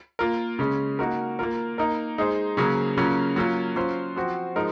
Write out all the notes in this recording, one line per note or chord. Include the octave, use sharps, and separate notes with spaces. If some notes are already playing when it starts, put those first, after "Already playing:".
A#3 F4 A#4
C#3 G#3 C#4
A#3 D#4 F#4 A#4
A#3 F4 A#4
A#3 D#4 A#4
G#3 D#4 G#4 C5
C#3 F#3 A#3 C#4 G#4
C#3 F#3 A#3 C#4 F4
F#3 A#3 C#4 F4
F#3 C#4 F4 C5
F3 C4 F#4 C5
F3 G#3 D#4 A#4